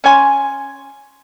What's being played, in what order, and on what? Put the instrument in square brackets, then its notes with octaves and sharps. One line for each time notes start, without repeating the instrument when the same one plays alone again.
[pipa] C#4 C#5 G#5 C6